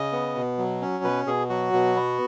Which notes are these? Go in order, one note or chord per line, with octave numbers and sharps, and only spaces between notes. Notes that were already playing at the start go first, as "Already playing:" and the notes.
Already playing: C#3 D#5
B3
B2
F#3
C#4
B2 B4
B2 G#4
F#3 F#4
B2
B3